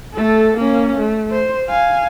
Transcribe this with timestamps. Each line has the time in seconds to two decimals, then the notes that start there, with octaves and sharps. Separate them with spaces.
0.14 A3 A4
0.57 A#3 C#4
0.98 A3
1.32 C5
1.68 F5 G#5